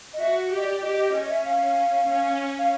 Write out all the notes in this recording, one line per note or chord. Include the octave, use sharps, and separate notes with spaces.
D#5
F#4 E5
G4 D#5
D5
G4 D#5
D#5
C#4 D#5
E5
F5
C#4
F5